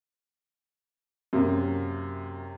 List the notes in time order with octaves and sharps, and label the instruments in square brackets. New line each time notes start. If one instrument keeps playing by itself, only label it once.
[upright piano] F#2 C3 A#3